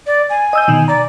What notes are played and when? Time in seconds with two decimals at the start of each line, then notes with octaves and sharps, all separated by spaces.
0.07 D5
0.30 G#5
0.53 D#5 E6 G6
0.68 B2 D#3
0.88 D5 A#5